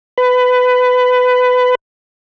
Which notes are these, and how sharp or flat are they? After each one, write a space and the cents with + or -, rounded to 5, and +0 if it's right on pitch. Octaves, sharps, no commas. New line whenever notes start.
B4 +20